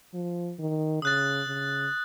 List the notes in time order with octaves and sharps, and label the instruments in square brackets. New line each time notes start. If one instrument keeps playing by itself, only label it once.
[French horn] F3
D#3
[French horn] C#3 [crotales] D#6 F#6 A6
[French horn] C#3